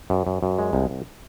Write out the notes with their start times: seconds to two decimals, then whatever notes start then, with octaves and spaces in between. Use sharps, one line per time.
0.10 F#2
0.27 F#2
0.43 F#2
0.59 G#3
0.73 C2
0.90 C2